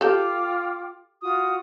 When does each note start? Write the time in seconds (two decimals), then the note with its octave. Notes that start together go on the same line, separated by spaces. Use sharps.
0.01 F4 G4 A4 G5 D6
1.22 F4 F#4 D#6